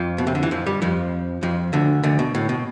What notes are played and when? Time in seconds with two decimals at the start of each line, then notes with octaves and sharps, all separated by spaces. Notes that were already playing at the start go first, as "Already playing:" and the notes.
Already playing: F2 F3
0.18 B2
0.27 C3
0.35 D3
0.43 E3
0.51 F2 F3
0.66 G2 G3
0.82 F2 F3
1.43 F2 F3
1.73 D2 D3
2.03 D2 D3
2.19 B2
2.35 A2
2.49 B2